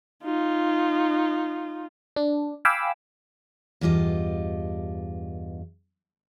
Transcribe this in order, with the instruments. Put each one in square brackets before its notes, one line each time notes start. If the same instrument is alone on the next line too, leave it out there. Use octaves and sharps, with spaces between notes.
[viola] D#4 F4
[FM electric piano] D4
F5 G5 G#5 B5 D6 E6
[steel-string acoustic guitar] E2 G2 F4 G4 D#5